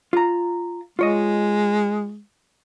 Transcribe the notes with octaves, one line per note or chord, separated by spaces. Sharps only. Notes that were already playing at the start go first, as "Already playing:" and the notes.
F4 A#5
G#3 F4 C#5 D#5